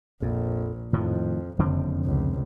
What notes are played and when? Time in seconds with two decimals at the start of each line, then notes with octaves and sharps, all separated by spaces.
0.22 A#1 F2
0.93 F2 A2 D#3 F3
1.59 F#1 F2 D3 C4
2.06 F1 C#2